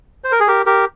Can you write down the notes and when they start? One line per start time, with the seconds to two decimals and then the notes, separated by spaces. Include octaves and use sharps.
0.24 C5
0.32 A#4
0.40 G#4
0.48 G4 A#4
0.66 G4 A#4